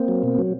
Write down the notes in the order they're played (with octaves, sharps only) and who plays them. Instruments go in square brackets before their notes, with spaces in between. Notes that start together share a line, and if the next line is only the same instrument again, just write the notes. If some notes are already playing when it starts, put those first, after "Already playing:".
Already playing: [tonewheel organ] A#3 C4
F#3
B2
F#3